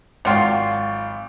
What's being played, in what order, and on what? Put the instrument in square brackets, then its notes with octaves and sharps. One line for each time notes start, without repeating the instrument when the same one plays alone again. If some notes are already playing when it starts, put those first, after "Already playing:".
[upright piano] G#1 G5 C#6 [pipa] F#3 F4